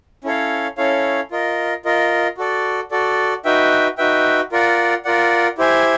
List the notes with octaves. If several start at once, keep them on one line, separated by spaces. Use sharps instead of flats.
C#4 E4 A4 C#5 F5
C#4 E4 A4 C#5 F5
F4 A#4 D#5
F4 A#4 D#5
F#4 A4 D5
F#4 A4 D5
D#4 F#4 B4 E5 G5
D#4 F#4 B4 E5 G5
F4 A#4 D5 F#5
F4 A#4 D5 F#5
E4 G4 C5 E5 G#5